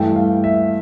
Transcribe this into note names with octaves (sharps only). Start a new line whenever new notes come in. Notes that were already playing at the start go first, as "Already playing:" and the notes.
Already playing: G2 E3 A3 G5
F5
E5